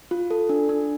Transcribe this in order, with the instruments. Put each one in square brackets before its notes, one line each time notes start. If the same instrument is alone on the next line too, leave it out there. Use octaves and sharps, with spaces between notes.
[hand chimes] F4
A4
D4
D4